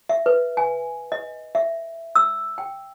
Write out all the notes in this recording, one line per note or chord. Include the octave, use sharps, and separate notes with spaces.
E5
B4
G#5
D#5
E5
E6
G5